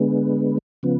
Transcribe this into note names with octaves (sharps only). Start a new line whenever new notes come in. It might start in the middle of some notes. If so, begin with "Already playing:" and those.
Already playing: D3 G#3 B3
C#3 F3 B3